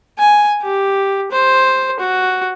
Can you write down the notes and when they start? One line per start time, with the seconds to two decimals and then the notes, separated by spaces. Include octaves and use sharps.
0.18 G#5
0.62 G4
1.31 C5
2.00 F#4